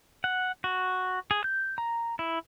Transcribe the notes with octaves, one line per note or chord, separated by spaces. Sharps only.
F#5
F#4
G#4
G6
A#5
E4